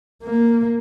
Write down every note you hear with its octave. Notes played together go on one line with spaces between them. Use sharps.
A#3